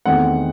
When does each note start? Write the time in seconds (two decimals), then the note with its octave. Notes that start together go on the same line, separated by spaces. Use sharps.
0.06 E2 D#3 A3 C4 F#5